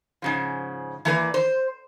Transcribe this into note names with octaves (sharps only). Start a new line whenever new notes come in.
G#2 C#3 F3
E3 A#3 B4 D5
C5